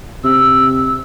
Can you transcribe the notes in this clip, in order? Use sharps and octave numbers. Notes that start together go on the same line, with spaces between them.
C3 E6